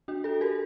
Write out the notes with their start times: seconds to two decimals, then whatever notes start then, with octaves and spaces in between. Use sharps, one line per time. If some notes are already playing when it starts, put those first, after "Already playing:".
0.08 D4 F#4
0.24 F#4 A4
0.41 G4 A#4